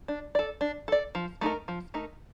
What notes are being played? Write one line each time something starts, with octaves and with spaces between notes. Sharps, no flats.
D4
A4 D5
D4
A4 D5
F3
A3 D#4 A#4
F3
A3 D#4 A#4